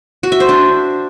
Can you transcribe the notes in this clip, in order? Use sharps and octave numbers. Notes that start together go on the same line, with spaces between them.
F#4
E5
C5
D4